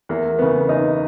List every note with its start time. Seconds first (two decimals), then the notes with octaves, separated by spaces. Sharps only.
0.09 E2 A#3
0.39 C#3 E3 B3
0.69 E2 D#4